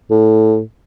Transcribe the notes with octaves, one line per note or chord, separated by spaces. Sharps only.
A2